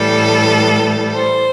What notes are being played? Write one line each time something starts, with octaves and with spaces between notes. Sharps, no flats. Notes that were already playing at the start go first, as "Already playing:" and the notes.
Already playing: A2 E3 G3 A4
C5